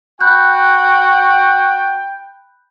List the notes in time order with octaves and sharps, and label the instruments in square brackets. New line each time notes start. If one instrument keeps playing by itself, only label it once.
[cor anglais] F#4 [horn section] G5 [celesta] B5 F#6 G6